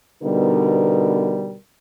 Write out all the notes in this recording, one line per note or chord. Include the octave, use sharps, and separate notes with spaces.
B2 D3 G3 B3 D#4 A#4